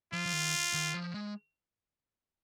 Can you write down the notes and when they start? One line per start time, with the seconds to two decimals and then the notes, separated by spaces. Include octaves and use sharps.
0.13 F3 F4
0.26 F3
0.32 D#3
0.74 D#3
0.94 F3
1.14 G#3